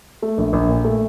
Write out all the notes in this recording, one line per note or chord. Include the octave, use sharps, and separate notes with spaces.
A3
A#1
A#1
A#2
A3